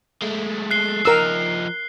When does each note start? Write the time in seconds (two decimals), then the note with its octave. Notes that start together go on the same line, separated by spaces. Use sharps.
0.22 G#3 A3
0.71 F#6 C7 G7
1.05 F3 D#4 A#4 E6